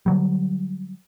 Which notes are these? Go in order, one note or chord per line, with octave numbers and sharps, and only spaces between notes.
D3 F#3 G3